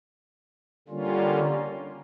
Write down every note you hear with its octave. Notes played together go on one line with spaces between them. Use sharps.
D3 G3 A#3 C#4 F4